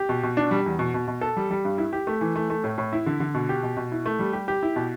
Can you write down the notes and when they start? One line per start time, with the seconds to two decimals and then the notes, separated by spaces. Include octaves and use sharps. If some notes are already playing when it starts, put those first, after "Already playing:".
Already playing: G4
0.09 B2
0.23 B2
0.37 D4
0.51 G3
0.66 E2
0.79 B2
0.94 B2
1.08 B2
1.21 A4
1.37 G3
1.51 G3
1.65 G2
1.78 E4
1.93 G4
2.07 A3
2.21 E3
2.36 A3
2.50 A3
2.64 A2
2.78 A2
2.93 E4
3.06 D3
3.20 D3
3.34 B2
3.49 G4
3.63 B2
3.77 B2
3.92 E4
4.06 A3
4.19 G3
4.33 G4
4.48 G4
4.63 E4
4.76 B2